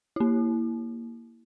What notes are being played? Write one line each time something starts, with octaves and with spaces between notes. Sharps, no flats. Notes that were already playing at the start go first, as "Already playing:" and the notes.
A#3 E4